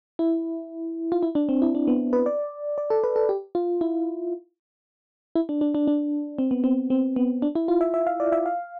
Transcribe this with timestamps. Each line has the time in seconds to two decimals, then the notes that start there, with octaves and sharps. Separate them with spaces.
0.19 E4
1.12 F4
1.23 E4
1.35 D4
1.49 C4
1.62 E4
1.75 D4
1.88 B3
2.13 B4
2.26 D5
2.78 D5
2.90 A4
3.04 B4
3.16 A4
3.29 G4
3.55 F4
3.81 E4
5.35 E4
5.49 D4
5.61 D4
5.75 D4
5.87 D4
6.39 C4
6.51 B3
6.64 C4
6.90 C4
7.16 B3
7.42 D4
7.55 E4
7.68 F4
7.81 E5
7.94 E5
8.07 F5
8.20 D5
8.32 E5
8.46 F5